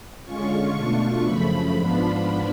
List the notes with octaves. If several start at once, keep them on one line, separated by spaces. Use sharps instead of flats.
D3 G#3 C#4 F4 C#6
B2 A3 D4 F4
F#2 C#3 F3 A3 B5
G#2 F3 B3 D4 F4